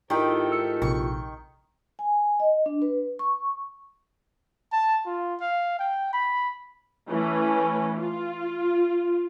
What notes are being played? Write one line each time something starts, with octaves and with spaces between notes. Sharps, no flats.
G#2 D#3 E4 F4 G4 A4 A#4 G5
E6 C#7
A#1 C3 C#6
G#5
D#5
D4
B4
C#6
A5
F4
F5
G5
B5
E3 A3 C#4
F4